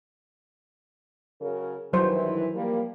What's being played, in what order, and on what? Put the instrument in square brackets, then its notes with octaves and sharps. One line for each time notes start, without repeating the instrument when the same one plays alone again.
[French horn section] C#3 F#3 A#4
[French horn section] G2 D#3 E3 [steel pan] F#3 C5
[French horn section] F3 G3 A#3